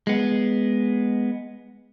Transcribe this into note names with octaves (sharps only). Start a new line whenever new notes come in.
G#3 B3